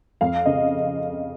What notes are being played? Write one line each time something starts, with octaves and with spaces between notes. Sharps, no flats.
F2 F5
C#3 D#5